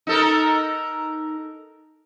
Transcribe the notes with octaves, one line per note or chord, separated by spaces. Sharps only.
D#4 A4 A#4